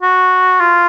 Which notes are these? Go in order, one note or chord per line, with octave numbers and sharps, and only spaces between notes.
F#4
F4